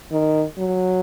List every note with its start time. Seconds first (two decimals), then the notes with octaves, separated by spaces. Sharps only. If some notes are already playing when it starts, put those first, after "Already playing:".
0.12 D#3
0.58 F#3